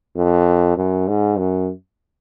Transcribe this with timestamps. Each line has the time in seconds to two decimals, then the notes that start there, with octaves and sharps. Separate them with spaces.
0.16 F2
0.77 F#2
1.08 G#2
1.38 F#2